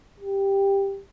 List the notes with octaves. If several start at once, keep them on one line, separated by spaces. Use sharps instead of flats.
G4